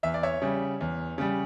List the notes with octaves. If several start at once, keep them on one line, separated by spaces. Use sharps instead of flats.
E2 E5
D5
C#5 E5
C#3 G3
E2
C#3 G3